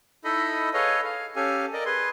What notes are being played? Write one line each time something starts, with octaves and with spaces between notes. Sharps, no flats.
D#4 E4 A4 D#5 B5
G#4 A4 B4 C#5 D#5 F5
F5
C#4 G4 A4 F5 G#5
A#4 D5 D#5
G#4 B4 C6